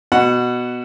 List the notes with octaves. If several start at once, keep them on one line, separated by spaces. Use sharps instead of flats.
B2 F#5